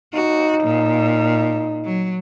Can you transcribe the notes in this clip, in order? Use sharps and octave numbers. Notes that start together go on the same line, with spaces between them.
D#4 F#4
A#2
F#3